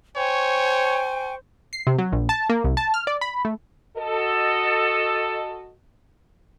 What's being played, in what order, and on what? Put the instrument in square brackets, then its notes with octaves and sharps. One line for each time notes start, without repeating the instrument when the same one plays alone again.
[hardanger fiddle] C5 [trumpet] C#5 [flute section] G5 G#5 C#6
[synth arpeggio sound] C7
C3
F#3
A#1
A5
A#3
C2
A5
F6
D5
B5
A3
[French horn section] F#4 A4 D#5